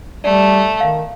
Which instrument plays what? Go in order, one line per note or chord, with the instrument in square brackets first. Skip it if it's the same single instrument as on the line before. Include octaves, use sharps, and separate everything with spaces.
[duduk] G3 [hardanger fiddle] A3 [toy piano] D5
[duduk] D#3 [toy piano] F5